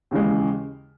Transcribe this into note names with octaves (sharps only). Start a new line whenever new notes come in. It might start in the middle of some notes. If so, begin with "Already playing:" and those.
D#2 C#3 E3 G#3